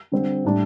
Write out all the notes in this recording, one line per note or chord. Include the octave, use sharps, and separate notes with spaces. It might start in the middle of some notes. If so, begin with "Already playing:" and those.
D3 G3 C4
A2 G3 D4